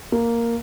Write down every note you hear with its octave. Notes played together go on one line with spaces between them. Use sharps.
A#3